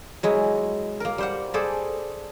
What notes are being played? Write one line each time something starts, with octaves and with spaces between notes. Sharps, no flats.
F#3 G#3 E4
A#3 A#4
G3 C5 F#5
G#4 A4 C5 D5 B5